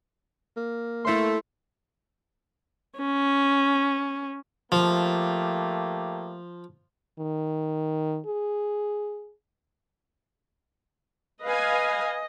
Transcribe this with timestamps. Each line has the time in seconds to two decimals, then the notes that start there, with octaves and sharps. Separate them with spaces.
0.57 A#3
1.05 A3 E4 C5 C6
2.99 C#4
4.72 F3 A3 A#3 G4
7.19 D#3
8.26 G#4
11.44 B4 D#5 F5 G#5